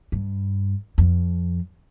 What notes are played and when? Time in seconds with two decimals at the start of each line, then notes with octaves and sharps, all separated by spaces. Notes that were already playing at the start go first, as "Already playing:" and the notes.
0.12 G2
0.98 F2